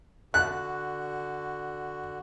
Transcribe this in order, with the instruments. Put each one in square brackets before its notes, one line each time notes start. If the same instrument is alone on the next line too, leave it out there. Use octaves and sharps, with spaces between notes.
[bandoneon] D3 F#4 [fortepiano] F#6